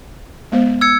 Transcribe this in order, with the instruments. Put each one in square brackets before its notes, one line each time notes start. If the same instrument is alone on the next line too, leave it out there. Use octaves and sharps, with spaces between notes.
[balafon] G#3 B3 C5
[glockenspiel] E6 G#6 C#7